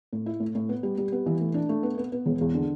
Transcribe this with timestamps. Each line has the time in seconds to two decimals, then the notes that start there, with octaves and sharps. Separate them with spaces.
0.13 A2
0.26 E4
0.40 A2
0.55 A2
0.69 B3
0.83 G3
0.98 G3
1.12 B3
1.26 E3
1.41 A3
1.54 D4
1.69 A3
1.83 B3
1.98 B3
2.12 B3
2.26 E1
2.41 E2
2.55 D3